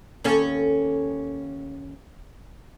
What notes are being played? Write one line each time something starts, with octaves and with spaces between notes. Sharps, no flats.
D#2 C#4 A4